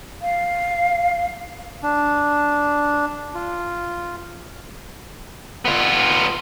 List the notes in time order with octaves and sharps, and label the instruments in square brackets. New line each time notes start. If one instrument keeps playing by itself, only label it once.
[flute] F5
[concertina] D4
F4
[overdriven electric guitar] B3 F4